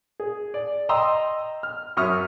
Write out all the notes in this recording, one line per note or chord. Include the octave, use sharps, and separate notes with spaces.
G#4
D5
D#5 G5 A#5 C6 D#6 E6
F6
F#2 E5 C#6 D#6 F6